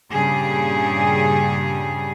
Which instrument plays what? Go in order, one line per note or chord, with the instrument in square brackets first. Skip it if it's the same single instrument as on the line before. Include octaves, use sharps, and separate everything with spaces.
[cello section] G2 A#2 C#3 G3 G4 G#4